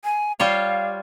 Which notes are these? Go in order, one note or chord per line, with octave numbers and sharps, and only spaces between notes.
G#5
G3 F4 C#5 F5